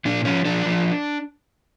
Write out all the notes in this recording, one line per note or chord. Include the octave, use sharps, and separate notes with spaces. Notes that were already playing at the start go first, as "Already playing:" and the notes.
A#2 D4
F3 C#4
F3 D4
F3